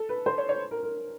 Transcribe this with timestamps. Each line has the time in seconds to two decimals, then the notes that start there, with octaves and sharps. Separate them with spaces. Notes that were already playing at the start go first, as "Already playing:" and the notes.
Already playing: A4
0.09 B4
0.26 C5
0.38 C#5
0.49 C#5
0.71 A#4
0.83 A#4